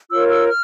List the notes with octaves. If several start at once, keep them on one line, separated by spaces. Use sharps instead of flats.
F4 A#4 C#5 E6
E6
F6